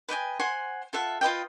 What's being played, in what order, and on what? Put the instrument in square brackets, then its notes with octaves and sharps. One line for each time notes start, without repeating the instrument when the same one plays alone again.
[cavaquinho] B4 D#5 G5 G#5
C5 F#5 G#5 C6
F4 A4 E5 F#5
F4 B4 D#5 G5